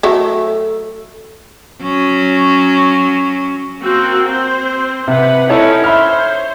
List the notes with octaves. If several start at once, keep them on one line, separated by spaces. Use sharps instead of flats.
F#3 A3 A4
F#3 C#4
A#3 C4 F#4
C4 C5
C3 B4 F#5
C#4 D#4 E4 A4 C#5
C5 C#5 E5 B5 F6